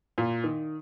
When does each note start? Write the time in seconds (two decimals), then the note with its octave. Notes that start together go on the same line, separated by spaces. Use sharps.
0.18 A#2
0.44 D#3